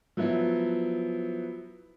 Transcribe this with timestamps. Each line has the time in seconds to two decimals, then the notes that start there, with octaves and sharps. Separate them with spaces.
0.17 F3 F#3 B3 E4